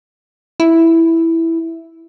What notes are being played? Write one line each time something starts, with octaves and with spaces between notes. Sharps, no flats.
E4